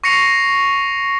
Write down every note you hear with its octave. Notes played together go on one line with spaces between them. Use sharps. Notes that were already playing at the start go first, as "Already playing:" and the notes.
C#6 A#6 C7 C#7 F7